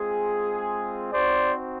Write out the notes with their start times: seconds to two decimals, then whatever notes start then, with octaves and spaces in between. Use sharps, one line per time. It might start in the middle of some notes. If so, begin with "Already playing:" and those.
Already playing: G#3 C4 F4 G#4
1.13 C4 D#4 F#4 C5 D5